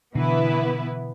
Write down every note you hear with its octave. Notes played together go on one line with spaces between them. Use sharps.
B2 D3 E3 B3 E4 B4